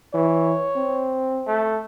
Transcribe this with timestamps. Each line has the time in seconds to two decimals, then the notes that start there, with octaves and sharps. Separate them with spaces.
0.14 E3 C#5
0.76 C4
1.47 A3